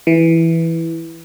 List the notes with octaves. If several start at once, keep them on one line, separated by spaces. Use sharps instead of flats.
E3